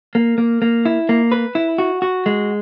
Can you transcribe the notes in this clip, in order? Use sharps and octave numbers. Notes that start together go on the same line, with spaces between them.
A#3
A#3
A#3
E4
A#3
B4
E4
F#4
F#4
G#3